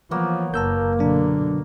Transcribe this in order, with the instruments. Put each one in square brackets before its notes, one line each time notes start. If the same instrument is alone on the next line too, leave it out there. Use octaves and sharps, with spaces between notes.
[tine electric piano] E3 [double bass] F3 [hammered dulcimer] A#3 B3 C#5
[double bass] F#1 [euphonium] A#3 [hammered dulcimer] A#4 [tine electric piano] A5 E6 G6
[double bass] B2 D3 [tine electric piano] F#3 D4